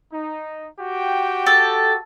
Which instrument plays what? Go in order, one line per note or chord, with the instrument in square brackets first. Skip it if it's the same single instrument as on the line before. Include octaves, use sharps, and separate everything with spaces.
[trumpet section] D#4
F#4 G4 G5
[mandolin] A4